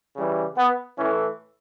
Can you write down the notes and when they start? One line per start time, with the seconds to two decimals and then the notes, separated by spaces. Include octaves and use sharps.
0.15 C#3 E3 G3
0.57 B3
0.98 A2 E3 A3 C#4